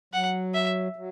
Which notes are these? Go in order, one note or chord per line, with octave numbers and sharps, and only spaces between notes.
F#3 F#5
E5
F#3